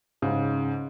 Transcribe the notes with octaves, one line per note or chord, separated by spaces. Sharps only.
G#2 C#3